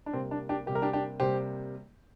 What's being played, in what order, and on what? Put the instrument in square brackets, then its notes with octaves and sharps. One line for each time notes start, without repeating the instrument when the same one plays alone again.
[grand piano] D4
C3 G3 A#3 C4
D4
D4 G4
C3 G3 A#3 G4
A#4
D4 G4
D4 G4
C3 G3 A#3 G4 C5